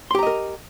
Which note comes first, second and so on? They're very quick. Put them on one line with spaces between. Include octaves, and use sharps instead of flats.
C6 G4 A#5 D#5 A#4